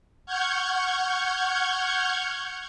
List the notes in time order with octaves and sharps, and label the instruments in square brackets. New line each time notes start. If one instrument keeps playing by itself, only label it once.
[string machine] F#5 C#6 F6 G6 G#6